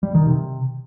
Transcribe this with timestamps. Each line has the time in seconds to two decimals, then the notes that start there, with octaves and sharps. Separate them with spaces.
0.03 G3
0.15 D#3
0.26 C3